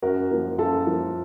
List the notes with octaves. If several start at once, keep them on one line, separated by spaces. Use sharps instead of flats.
F#2 F#4 A#4
F3 A#3
F#2 F4 A4
F3 A#3